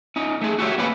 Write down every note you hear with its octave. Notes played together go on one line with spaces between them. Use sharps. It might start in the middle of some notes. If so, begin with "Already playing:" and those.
C#4 D#4
A3 G#4
F#4 G4 A4 A#4 C#5 E5
A#3 B3 C#4 G4 B4 B5